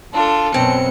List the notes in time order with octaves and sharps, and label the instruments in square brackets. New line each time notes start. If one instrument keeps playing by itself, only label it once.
[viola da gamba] D4 A4 [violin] F4 [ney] A5
[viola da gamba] F#2 B2 F#3 [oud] C4 [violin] C#7